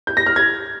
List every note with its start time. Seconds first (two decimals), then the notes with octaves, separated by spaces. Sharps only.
0.07 G6
0.17 A#6
0.27 F6
0.36 G#6